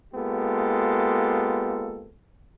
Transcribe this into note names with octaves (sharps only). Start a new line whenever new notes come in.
G#3 A#3 B3 F4 G4 A4